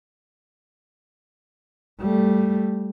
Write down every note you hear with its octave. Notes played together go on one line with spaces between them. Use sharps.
G3 A3